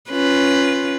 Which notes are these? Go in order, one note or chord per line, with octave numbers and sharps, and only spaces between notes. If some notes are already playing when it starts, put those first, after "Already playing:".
C#4 F4 B4